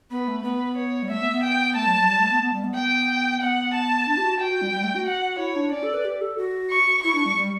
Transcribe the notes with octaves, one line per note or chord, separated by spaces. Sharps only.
B3 B4
A3
B3 B4
C#5
G3
A3 E5
B3
B3
G5
A3 A5
F#3
F#3
G3
A3
B3
B3
G3
B3
G5
B3 F#5
A5
D4
G4
F#4
F#4 G5
F#4
G3
G3
A3
F#4
F#5
E4 C#5
D4
C#4 D5
A4
B4
G4
A4
F#4
C#6
E4 C#6
D4
G3
G3